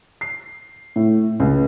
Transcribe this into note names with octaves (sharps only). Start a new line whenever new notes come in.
C7
A2
C#2